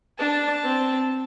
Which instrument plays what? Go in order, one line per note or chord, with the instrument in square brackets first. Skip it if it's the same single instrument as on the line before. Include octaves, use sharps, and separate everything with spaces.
[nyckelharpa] D4 [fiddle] A5
[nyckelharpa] C4